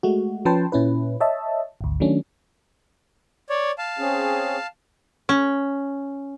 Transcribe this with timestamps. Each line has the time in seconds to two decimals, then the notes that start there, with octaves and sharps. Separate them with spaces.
0.03 G#3 A3 F#4
0.45 F3 C#4 B4 G5 A5 C6
0.72 A#2 C#4 E4 B4
1.20 C#5 D#5 E5 A5
1.81 G#1 D2
2.00 D#3 F#3 A3 C#4 D4
3.49 C#5 D5
3.78 F5 A5
3.99 C4 C#4 G#4
5.29 C#4